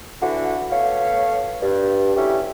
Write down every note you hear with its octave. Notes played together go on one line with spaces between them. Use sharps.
D3 E3 E4 F#4
B2 A3 C#5 F5
G2
G2 F#3 A3 C#4 E4 G4